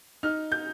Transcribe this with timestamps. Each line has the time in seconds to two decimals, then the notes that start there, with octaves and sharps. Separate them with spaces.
0.23 D#4 F6
0.52 G6